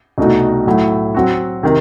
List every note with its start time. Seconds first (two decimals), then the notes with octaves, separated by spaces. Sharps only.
0.18 C2 B2 A3 D#4 F#4
0.66 A2 F#3 A3 E4
1.15 F#3 C4 F#4
1.63 C3 D#3